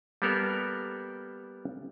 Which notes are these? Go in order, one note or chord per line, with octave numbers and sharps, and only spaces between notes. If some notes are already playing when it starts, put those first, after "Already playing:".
G3 A#3 B3 A4 A#4